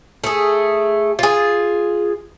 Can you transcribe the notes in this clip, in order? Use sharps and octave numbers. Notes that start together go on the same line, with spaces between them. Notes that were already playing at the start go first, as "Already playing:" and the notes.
A3 G#4
F4 G#4